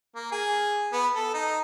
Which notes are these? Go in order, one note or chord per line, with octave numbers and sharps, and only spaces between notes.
A#3
G#4
B3
A4
D#4